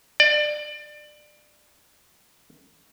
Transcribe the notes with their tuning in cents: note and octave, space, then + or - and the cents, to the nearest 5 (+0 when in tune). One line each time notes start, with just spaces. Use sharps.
D5 +25